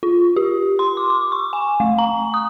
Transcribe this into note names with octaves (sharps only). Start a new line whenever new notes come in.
F4
G4
C6
D6
D6
C#6
G#5
A3
A#5
D#6